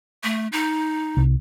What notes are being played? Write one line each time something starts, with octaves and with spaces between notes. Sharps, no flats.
A3
D#4
C2